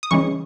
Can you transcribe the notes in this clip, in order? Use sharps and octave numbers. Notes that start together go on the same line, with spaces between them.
D#6
C#3 E3 G#3 C#4 C#6